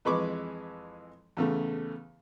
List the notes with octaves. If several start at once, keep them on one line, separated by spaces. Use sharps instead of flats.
F2 E3 G#3 B5 C#6 D6
E2 C#3 A3